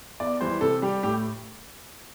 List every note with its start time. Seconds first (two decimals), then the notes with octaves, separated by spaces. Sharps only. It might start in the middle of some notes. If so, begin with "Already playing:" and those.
0.20 E2 D5
0.41 E3 G3 C5
0.61 C3 A4
0.82 G3 G4
1.03 A2 G4